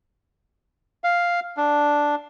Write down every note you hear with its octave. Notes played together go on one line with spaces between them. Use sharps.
F5
D4